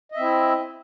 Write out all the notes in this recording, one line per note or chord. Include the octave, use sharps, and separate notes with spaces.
C4 E4 D#5 E5